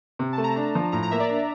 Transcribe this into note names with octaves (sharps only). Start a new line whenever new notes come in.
C3
A5
A3
A#5
D4
F3
A2 A#5
A#5
A#3 E5
D5
D4